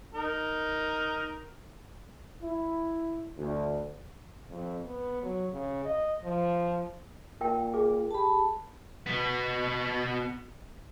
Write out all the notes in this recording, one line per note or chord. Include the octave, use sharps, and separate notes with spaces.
D#4 A#4
E4
D2
F2
B3
F#3
C#3
D#5
F3
A#2 A#4 G5
G#4
G4 A5 B5
B2 B3